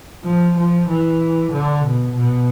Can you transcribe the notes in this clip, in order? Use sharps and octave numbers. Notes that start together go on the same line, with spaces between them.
F3
F3
E3
D3
B2
B2